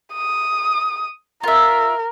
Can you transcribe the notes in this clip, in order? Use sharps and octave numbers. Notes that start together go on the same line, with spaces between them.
D#6
F4 A#4 E5